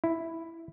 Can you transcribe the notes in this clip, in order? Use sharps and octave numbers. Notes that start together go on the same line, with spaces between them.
E4